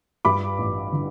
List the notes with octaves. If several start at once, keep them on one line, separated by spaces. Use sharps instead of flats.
G2 B5 D6
A1
D3